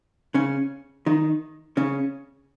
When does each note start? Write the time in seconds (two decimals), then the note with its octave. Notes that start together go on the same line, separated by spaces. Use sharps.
0.34 C#3 C#4
1.06 D#3 D#4
1.77 C#3 C#4